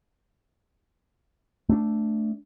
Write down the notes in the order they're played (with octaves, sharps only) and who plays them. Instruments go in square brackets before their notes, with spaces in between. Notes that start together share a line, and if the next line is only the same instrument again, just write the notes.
[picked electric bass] A3 D4